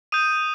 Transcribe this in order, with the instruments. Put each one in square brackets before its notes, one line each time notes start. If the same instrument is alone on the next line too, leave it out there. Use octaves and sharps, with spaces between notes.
[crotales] D#6 G6 D#7